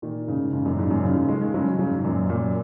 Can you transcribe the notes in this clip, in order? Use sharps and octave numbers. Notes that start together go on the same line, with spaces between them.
A#2 D#3
G#2 C#3
G#2 C#3
F#2 A#2
G#2 C#3
F#2 A#2
G#2 C#3
C#3 F#3
D#3 G#3
D#3 G#3
C#3 F#3
C#3 F#3
G#2
F#2 A#2
F#2 A#2